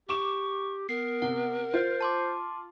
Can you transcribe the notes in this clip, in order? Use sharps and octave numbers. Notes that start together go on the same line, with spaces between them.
G4 C#6 D6 E7
B3 A#4 C7
C3 F#5
F4 C5
A5 C6 D6